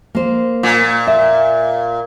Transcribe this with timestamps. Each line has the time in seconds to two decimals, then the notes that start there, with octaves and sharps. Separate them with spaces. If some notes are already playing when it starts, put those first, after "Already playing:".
0.15 A#3 C5
0.63 A#2
1.07 E5